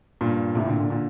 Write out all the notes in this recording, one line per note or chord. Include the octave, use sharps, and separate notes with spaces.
G2 A#2
A2 C3
A#2 D3
A#2 D3
A#2 D3